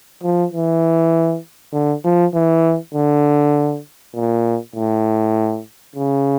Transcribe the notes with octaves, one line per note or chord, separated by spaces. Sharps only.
F3
E3
D3
F3
E3
D3
A#2
A2
C#3